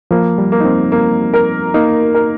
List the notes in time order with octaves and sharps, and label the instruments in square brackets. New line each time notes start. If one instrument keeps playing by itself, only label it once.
[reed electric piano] F3 [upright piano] A#3
[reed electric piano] G3
[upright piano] A#3
[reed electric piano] D#4
C4
[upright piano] A#3
A#4
[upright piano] A#3 [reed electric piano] D#4
[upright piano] A#4